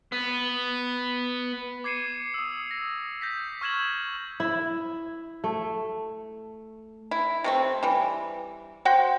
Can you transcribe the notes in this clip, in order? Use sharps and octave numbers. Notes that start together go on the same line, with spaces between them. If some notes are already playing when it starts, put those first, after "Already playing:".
B3
D6 G#6 C7 C#7 D#7 E7
D#6 E6
A#6
G6 A#6 B6
C#6 F6 G#6 E7 F#7
E4
A3
E4
C3 A3 C4
E3 G3
F#4 C5 F#5 G5